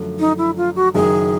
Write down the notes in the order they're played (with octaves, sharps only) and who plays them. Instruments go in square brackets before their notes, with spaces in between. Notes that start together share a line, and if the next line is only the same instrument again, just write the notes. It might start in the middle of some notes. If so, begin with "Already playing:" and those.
Already playing: [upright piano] F#2 D3 F3 A3 D4
[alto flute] D#4
E4
F4
F#4
[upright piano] F#1 F#2 D#3 [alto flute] G#4